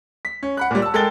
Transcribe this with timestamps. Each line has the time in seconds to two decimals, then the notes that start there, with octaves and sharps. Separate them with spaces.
0.25 B6
0.43 C#4
0.57 F#5 B5 F#6
0.71 A#2 G3
0.82 A5 E6
0.94 G#3 A4 A#4 G5 A6 G7